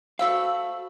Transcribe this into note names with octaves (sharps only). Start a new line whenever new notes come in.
A3 F#4 C5 F5 B5 E6